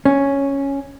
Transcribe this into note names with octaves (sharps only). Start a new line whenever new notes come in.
C#4